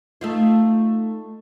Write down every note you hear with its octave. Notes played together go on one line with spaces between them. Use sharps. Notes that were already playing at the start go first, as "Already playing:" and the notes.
A3 D#4 F4